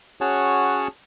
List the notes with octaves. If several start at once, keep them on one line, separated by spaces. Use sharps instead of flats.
C#4 F#4 G#4 C#5 F#5 A5